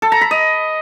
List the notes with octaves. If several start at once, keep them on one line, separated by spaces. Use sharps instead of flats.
A4
A#5
B5
D#5